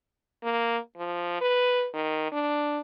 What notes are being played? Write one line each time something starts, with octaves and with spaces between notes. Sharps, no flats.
A#3
F3
B4
D#3
D4